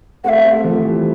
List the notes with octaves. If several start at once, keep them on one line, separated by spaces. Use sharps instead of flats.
A3 C4 F#5
E5
A3 C4
F3 A3
E3 G3